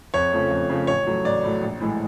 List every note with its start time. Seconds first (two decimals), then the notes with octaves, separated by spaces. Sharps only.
0.14 F2 C#5
0.32 C#3 F3 A3
0.51 F2
0.70 C#3 F3 A3
0.87 A1 C#5
1.07 A2 F#3 A3
1.24 A1 D5
1.43 A2 F#3 A3
1.62 A#1
1.80 A2 E3 G#3